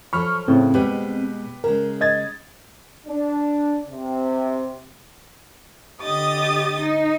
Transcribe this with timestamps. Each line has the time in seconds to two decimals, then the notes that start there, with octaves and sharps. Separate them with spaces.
0.13 F3 F#3 A4 B5 C#6 F6
0.48 A2 C#3 C4
0.74 B2 G3 G#3 B3 G4 B4
1.64 C#3 G#3 A#4
2.01 D#5 G#6 A6
3.07 D4
3.89 C3
6.03 D3 G4 D#5 D#6 A6
6.81 D#4